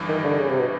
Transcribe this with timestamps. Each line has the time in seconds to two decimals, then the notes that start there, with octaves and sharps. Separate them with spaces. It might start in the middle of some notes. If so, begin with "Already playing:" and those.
Already playing: G1 G2 E3
0.09 D#3
0.24 D3
0.39 C#3
0.49 C3
0.59 B2